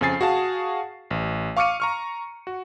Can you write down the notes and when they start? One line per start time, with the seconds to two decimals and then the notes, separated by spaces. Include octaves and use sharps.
0.01 F2 C#3 C4 G#5 A6 C7
0.21 F#4 G#4 F5 A5
1.11 A1
1.57 F5 C#6 D6 F6 C#7 D#7
1.80 A#5 C#6 F6
2.47 F#4